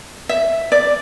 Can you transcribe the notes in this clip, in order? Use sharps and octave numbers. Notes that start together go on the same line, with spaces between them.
E5
D5